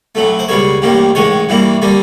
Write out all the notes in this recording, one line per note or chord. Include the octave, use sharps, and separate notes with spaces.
B1 A2 F#3 A3
C5
C#2 B2 G3 A#3 C#5
A1 G2 D#3 G3 A#3
A1 G#2 D#3 G#3 C#5
G2 E3 G3 A#3
D3 G3 A#3